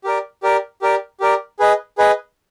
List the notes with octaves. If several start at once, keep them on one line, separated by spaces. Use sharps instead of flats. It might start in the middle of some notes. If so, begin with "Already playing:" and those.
G4 A#4 D5
G4 A#4 D5
G4 A#4 D5
G4 A#4 D5
G#4 B4 D#5
G#4 B4 D#5